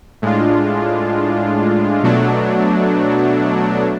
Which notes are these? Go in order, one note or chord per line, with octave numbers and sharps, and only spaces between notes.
A2 G#3 D4 F4
B2 F#3 A3 D4